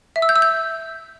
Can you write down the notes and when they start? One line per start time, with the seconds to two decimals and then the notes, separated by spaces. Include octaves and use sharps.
0.16 E5
0.22 E6
0.29 G6
0.36 E6
0.42 G6